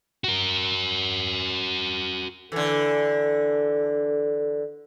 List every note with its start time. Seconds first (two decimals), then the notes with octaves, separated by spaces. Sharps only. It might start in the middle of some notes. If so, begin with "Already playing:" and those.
0.24 F#4 A#4
2.52 D3 E3 A4